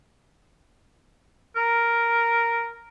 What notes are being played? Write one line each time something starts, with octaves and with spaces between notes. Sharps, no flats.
A#4